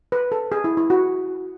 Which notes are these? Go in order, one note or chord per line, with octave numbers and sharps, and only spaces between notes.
B4
A4
G#4
E4
E4
F#4